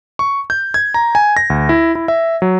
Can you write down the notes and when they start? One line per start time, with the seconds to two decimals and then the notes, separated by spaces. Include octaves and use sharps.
0.19 C#6
0.50 G6
0.74 G#6
0.94 A#5
1.15 G#5
1.37 A#6
1.50 D2
1.69 E4
1.95 E4
2.08 E5
2.42 F#3